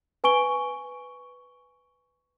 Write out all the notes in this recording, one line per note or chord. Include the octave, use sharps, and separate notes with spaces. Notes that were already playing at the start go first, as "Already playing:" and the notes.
B4 G#5 C#6 D7 G7